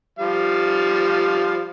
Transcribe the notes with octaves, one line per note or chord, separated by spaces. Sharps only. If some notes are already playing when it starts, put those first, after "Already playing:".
F3 G3 F5